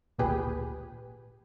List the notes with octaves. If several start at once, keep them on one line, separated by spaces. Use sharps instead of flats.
G#1 D2 A#2 G4 G#4 B4